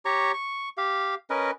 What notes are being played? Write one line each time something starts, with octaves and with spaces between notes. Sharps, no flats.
G4 C#5 A#5 C#6
C#6
G4 F5
C#4 A#4 B4 D#5